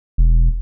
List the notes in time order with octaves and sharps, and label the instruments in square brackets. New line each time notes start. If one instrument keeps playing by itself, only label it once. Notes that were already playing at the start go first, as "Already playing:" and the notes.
[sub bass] E1